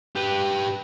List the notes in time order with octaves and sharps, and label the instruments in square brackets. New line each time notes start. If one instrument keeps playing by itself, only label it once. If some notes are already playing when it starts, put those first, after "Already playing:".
[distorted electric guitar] G4 B4